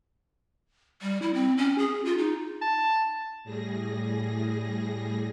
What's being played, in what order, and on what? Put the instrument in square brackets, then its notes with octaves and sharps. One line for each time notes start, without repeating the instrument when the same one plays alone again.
[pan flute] G3
E4
C4
C#4
G#4
F4
D#4
[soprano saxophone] A5
[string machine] A2 G3 G#4 A#6